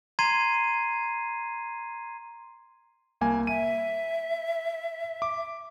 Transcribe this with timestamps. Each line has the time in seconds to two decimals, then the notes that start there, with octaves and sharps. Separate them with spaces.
0.19 A#5 C6 G#6 C7 D#7
3.21 C2 A#3 G#5
3.47 E5 D#7
5.22 D6